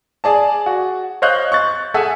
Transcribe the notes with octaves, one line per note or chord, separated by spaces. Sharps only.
G#4 D5 A5
F#4
C5 C#5 D#5 F5 F#6 G6
C#6 F#6 A6
G#4 A4 E5 F#5 G#5